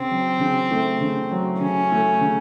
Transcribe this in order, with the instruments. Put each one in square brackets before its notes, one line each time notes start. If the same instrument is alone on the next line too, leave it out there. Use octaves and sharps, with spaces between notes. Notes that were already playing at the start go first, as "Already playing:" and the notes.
Already playing: [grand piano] C#3 [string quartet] C4
[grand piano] F#3
C#3
A3
C#3
F#3
[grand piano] C#3 [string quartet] C#4
[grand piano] A3
C#3